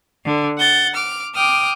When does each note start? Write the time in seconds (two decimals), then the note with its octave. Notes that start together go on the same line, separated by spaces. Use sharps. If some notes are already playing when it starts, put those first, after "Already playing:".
0.25 D3
0.58 F#5 G6 A6
0.94 D6 F6
1.34 G5 D6 D#6 F6